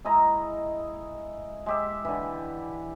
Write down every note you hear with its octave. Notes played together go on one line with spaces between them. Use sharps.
G#3 E4 D#5 A#5
G#3 G4 E5
D3 E3